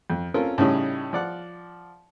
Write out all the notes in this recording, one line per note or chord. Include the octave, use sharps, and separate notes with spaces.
F2
C4 C#4 F4 A4 A#4
A2 C#3 G3 C#4 D#4
F3 D5 F#5